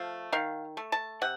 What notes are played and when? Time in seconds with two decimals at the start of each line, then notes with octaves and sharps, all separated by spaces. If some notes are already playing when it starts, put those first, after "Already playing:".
Already playing: F3 A3 F5
0.32 D#3 F5
0.77 A3
0.92 A5
1.22 C3 F#5